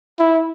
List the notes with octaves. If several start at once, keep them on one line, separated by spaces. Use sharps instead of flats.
E4